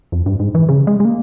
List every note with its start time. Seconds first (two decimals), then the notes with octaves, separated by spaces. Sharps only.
0.12 F2
0.26 G2
0.40 G#2
0.55 E3
0.69 C#3
0.87 G#3
1.00 G#3
1.05 A#3